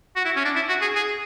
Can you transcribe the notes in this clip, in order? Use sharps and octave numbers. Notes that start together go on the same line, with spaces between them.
F#4
E4
C#4
D4
E4
F#4
G#4
G#4